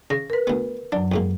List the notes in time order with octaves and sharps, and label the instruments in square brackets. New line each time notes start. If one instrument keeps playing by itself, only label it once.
[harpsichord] C#3 [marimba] A#6
[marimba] A#4 B4
[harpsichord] D2 B3
[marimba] F#2 F#3 [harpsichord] D4
[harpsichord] F2 G#2 A#3